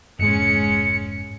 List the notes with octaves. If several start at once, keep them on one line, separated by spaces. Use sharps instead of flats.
F1 G#2 G#3 C#4 C#7